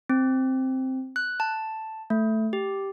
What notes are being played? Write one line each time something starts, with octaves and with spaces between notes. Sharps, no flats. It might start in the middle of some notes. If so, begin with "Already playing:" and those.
C4
F#6
A5
A3
G4